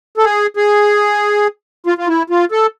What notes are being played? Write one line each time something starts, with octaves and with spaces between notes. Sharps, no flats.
A4
G#4
G#4
F4
F4
E4
F4
A4